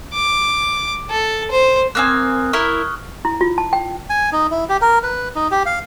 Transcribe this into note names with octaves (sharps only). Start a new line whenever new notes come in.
D6
A4
C5
A#3 C4 G#5 D#6 F6 F#6
E4 A#4 C#6 F6
E4
F4
A5
G5
G#5
D#4
E4
G4
A#4
B4
D#4
G4
F5